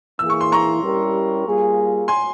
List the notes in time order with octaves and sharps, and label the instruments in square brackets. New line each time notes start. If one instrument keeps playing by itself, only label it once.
[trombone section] E3 A#3 E4 G#4 [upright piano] E6
[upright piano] C#6
C6
A#5 C#6
[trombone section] G3 C#4 E4 G4 A#4
G3 A#3 F4 G#4
[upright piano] G#5 C6